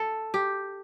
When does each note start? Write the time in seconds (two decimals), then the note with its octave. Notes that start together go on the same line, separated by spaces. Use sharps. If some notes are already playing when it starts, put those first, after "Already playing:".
Already playing: A4
0.34 G4